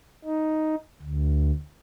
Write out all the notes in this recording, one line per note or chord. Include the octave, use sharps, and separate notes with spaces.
D#4
D2